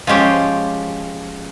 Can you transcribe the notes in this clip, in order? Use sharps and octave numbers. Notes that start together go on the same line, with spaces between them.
F3 G#3 C#4 G4